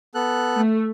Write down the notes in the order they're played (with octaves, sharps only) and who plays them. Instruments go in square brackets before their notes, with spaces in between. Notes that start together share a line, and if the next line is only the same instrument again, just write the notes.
[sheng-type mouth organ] B3 A4 F#6
[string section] A3